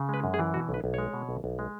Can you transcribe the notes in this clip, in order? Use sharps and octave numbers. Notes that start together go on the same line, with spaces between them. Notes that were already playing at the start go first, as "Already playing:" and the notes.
Already playing: C#3
G#3 B4
F#2
G#4
E3
B2 F#4
B1
B4
B1
G#3 C#5
B2
B1
B1
G#3